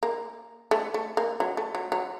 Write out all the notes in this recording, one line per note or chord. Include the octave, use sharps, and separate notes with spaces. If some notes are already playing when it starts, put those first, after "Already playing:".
A#3
A3
A3
A#3
F#3
A3
F#3
F#3